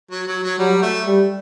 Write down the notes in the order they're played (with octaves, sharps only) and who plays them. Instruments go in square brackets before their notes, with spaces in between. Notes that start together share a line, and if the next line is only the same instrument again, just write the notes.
[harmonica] F#3
F#3
F#3
[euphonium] F#3 [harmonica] G3
[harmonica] A3
[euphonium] G3